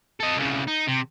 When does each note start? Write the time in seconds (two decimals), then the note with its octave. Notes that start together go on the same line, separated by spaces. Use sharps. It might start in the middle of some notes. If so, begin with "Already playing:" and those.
0.20 A4 D#5
0.37 C2 C#3
0.68 D#4
0.88 C3